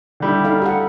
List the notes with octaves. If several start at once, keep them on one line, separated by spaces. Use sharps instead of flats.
D3 G3 E4
D#4 A4 F5
G4 A4 F#5